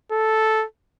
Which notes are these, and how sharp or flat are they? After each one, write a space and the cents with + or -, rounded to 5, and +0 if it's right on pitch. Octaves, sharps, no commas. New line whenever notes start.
A4 -5